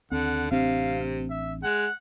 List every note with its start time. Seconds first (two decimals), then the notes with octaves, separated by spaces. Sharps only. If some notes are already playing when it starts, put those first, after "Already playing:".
0.12 D#2 D3 C4 F#5
0.51 A1 C3 C4 D4 F5
1.30 E5
1.63 G#3 F#5